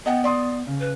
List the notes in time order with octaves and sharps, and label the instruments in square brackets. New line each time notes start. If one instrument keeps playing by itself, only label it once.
[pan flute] B3 [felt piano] D#5 F#5 G5
[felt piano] D5 C6 D#6
C#3
[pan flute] B4